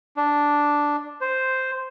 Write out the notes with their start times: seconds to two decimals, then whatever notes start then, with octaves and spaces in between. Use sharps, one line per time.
0.17 D4
1.21 C5